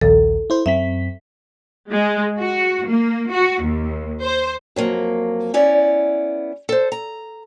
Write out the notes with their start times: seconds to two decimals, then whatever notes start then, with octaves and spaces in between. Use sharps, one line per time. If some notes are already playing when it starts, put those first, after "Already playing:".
0.01 A#1 D#2 A4
0.50 E4 C5
0.66 F#2 C4 E5 B6
1.91 G#3
2.39 F#4
2.88 A#3
3.31 F#4
3.63 D#2
4.23 C5
4.76 F2 F#3 A#3
5.54 B3 C#4 E4 D5
6.69 A4 C5
6.92 A#5